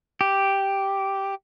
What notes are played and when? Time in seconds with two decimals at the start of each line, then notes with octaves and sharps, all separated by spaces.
0.21 G4